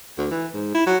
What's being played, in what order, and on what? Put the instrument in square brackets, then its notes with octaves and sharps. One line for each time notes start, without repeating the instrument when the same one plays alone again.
[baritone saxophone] D2
E3
G#2
E4
F#3